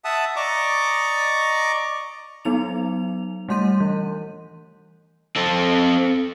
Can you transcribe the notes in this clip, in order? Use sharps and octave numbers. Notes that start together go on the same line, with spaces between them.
E5 F#5 A5 D#6
D5 D#5 A#5 C#6 D6
F#3 B3 D#4 F7
G3 A3 C6 G6 D#7
E3
C4 A4